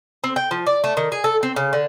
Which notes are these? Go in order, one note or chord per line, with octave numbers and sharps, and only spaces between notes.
C4
G5
F3
D5
A3
D#3
G#4
A4
C4
C#3
D3